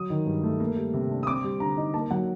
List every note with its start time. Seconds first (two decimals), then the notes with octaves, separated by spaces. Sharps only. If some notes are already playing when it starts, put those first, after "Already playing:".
Already playing: F#3 D#6
0.10 D#3
0.26 G2
0.43 A3
0.60 A#3
0.77 G3
0.94 C3
1.11 D4
1.23 D#6
1.26 C4 D6
1.44 G3
1.60 D3 A#5
1.77 D#4
1.94 A#3 A5
2.11 F#3 F#5